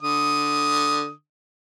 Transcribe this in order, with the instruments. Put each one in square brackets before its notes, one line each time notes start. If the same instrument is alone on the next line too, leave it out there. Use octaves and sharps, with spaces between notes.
[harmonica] D3 D#6